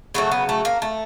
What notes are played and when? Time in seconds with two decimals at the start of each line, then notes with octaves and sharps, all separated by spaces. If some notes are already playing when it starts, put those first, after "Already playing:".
0.14 C#3 F#3 A3 B3
0.31 B3
0.49 A3
0.65 A#3
0.82 A3